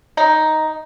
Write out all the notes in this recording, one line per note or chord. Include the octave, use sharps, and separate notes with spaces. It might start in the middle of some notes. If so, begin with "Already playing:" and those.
D#4